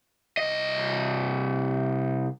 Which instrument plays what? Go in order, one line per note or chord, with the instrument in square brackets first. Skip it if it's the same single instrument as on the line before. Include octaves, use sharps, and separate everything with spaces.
[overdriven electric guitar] C2 D#5